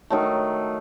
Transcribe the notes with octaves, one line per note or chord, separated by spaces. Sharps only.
D#3 F#3 A3